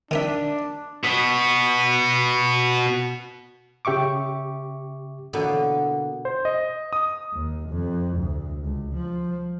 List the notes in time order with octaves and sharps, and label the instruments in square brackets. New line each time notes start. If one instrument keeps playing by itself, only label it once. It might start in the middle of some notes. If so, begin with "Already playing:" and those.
[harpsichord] D#3 D#4 E5 [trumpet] D4
[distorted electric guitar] B2 B3
[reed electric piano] C#3 G4 E5 C#6 D6
[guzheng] B2 D3 E3 A#3 B3
[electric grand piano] C5
D#5
D#6
[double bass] D#2
F2
D2
C#2
F3